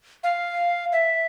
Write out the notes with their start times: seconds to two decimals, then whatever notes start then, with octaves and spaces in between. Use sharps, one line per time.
0.24 F5
0.92 E5